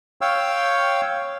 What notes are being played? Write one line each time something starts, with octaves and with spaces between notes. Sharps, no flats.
C#5 F5 G5 E6